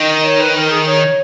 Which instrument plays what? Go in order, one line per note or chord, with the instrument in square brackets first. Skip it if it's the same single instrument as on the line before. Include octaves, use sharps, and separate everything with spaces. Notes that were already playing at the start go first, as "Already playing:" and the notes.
Already playing: [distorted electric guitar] D#3 [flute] D#5
[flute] C#5
B4
A#4
G#4
C#5